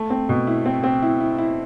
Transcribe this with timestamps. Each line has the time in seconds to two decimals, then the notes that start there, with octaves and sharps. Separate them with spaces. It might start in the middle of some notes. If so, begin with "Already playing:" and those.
Already playing: A3
0.10 C4
0.29 B2
0.47 E4
0.66 C4
0.84 C4
1.03 E4
1.20 E4
1.38 E4